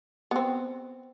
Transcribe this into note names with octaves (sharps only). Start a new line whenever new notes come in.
B3 C4